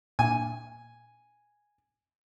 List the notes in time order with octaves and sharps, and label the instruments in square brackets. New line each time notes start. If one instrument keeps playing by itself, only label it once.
[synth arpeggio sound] A#2 [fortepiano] G#5